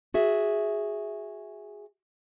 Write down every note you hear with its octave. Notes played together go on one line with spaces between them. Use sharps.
F#4 G#4 E5